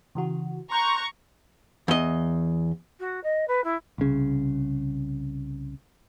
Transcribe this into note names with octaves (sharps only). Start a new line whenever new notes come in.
C#3 E3 F#4
A#5 C6 C#6 F#6 G6
E2 D#5
F#4
D#5
B4
E4
C2 C#3